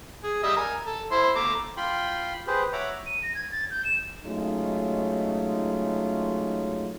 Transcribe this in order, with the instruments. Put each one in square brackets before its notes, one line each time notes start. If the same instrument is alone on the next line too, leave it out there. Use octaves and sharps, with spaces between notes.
[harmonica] G#4
G3 D#5 E5
A#4 G#5
A4
E4 C5 C6
A3 A#5 D6
[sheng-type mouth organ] F4 G5 B5 C6
G4 G#4 B4 C5
C#5 E5 F#5 A#5 D6
[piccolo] D#7
A#6
G#6
A6
G6
E7
[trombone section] F#3 G#3 A3 C#4 D#4 F4